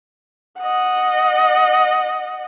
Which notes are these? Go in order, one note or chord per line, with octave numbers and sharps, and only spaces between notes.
D#5 F#5